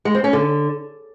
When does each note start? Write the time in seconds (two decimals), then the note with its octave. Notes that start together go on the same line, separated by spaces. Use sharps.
0.05 G#3
0.15 C4
0.24 C#4
0.33 D3